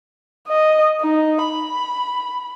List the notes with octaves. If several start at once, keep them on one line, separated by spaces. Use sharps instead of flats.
D#5
D#4
B5